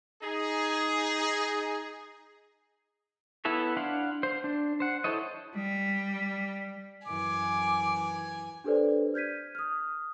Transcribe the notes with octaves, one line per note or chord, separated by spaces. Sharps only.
D#4 G#4
B3 E4 A4 B4 C#5
D4 F5 F#5 C6
C5
D4
C5 F#5
E4 A4 C5 C#5 D#5
G3
F#2 E3 G#5 D6
D4 G4 A4 B4 C5 D5
F6 G6 G#6 B6 D#7
D#6 F6